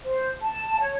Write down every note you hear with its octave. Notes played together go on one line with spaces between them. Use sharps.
C5
A5
C#5